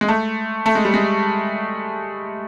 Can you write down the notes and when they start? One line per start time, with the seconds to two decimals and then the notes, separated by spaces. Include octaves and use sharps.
0.01 G#3
0.08 A3
0.66 A3
0.75 G#3
0.85 G3
0.94 G#3